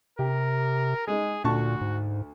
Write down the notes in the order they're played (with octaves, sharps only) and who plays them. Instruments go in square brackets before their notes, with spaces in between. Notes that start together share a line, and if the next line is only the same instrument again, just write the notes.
[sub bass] C3 [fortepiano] G4 [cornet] A#4
[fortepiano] G#3 D#4 [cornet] G#4
[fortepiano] D2 A5 C#6 [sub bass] A#2 [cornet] F#4
[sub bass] G#2